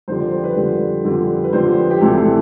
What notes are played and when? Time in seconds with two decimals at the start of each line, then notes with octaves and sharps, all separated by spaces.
0.08 F2 D3 G3 C5
0.20 D5
0.32 C5
0.44 B4
0.56 F2 D3 G3
1.04 F2 D3 G3
1.44 B4
1.53 F2 D3 G3 C5
1.77 B4
1.90 G4
2.01 D2 C3 E3 A4
2.17 A4